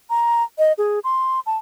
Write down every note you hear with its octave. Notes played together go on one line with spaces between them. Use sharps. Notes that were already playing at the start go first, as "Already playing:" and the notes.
A#5
D#5
G#4
C6
A5